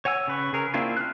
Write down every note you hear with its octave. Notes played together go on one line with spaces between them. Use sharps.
C#5 F#5 G#5 E6
C#3 B4 C#6
C#3 G#4 A#4
A#3 C4 D4 E4 F4
F6 F#6